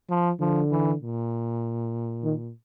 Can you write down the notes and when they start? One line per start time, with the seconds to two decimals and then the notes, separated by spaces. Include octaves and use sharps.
0.10 F3
0.40 D3 F3
0.71 E3
1.02 A#2
2.24 D#3